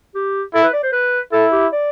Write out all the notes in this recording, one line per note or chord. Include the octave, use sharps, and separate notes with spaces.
G4
E4 A4
B4
D5
C5
B4
E4 A4
G4
D5